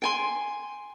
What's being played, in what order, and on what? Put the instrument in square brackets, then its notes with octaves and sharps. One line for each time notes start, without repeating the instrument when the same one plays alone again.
[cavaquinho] G5 G#5 C6